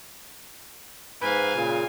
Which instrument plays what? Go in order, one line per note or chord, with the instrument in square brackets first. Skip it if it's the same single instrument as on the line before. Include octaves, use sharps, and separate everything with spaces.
[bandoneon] G#2 B4 B5 [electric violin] F5 G#5
[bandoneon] A#2 C#3